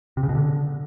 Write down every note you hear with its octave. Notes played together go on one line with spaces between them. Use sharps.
C3
C#3
B2
D3